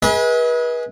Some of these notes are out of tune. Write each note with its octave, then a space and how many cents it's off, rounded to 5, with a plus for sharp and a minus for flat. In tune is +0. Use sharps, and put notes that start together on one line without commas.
G#4 +0 B4 -30 D#5 +45